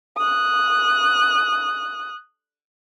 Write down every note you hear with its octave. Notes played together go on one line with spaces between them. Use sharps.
D#6 F#6